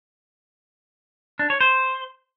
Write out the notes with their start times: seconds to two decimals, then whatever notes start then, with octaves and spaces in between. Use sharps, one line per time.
1.39 D4
1.50 C#5
1.61 C5